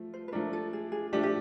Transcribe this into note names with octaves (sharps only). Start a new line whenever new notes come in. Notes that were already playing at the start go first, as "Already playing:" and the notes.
Already playing: F3 A3
C5
B4
F3 A3 D4 A#4
A4
G#4
G#4
F3 A3 D4 G4
G4